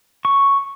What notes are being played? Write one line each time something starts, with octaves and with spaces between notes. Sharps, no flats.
C#6